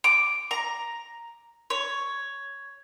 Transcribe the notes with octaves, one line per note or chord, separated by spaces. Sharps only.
D6
A#5
C#5